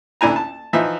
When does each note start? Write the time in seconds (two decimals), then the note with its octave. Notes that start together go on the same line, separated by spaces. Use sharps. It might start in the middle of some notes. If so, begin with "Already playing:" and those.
0.21 A1 D2 D4 E4 G#5 A#5
0.36 A5
0.73 E3 F3 D#4 E5